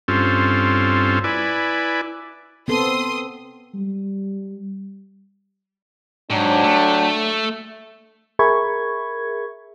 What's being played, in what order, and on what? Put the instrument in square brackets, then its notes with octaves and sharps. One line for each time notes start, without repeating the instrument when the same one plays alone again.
[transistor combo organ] G2 C4 C#4 F4 A4
E4 B4 D5 G#5
[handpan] B3 C4 A4 [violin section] C6 D#6
[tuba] G3
[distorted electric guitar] G#2 [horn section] F#3 D4 G4
[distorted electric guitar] A3
[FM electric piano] G#4 A#4 E5 B5 C#6 G#6